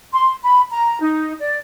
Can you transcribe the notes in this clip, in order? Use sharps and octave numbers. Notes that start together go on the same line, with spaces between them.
C6
B5
A#5
D#4
D5